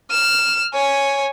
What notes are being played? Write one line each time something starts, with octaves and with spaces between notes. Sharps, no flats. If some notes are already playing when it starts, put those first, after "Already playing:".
F6 E7
C#5 G#5